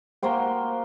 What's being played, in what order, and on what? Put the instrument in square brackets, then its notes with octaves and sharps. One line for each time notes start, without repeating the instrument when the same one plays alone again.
[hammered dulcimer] A#3 F#4 C5 G5